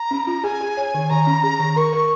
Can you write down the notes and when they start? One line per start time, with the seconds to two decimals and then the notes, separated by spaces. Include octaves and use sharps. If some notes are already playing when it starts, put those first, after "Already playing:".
Already playing: A#5
0.11 C#4
0.27 F4
0.44 G#4 G#5
0.61 G#4
0.77 C#5
0.94 D#3
1.10 D#3 A#5
1.27 C#4
1.44 G#4
1.60 D#3
1.76 A#4 C#6
1.93 A#4